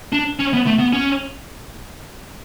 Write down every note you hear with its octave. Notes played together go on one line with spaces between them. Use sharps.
D4
C#4
B3
A3
B3
C#4